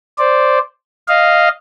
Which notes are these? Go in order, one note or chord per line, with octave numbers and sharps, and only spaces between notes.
C5 D5
D#5 F5